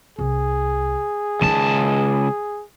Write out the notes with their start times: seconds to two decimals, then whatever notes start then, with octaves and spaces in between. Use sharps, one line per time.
0.19 C2 G#4
1.41 C#2 D#3 D#4 A5